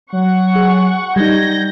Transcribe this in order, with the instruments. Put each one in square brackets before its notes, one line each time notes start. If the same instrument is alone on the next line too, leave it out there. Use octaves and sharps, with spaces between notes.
[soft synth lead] F#3 [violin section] F#5 C#6
[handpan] G#4
[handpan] G3 D#4 [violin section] G6 A#6 [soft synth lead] G#6